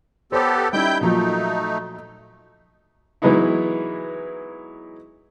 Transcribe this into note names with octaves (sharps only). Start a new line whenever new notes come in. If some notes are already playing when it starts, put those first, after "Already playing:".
B3 G4 A4 C5 C#5 E6
G3 C#4 D#4 E4 G5 G6
A#2 F3 F#3 A3 D#4
E3 F#3 G#3 B3 D#4 E4